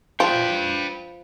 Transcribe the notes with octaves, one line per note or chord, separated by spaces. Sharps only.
F3 B4 G5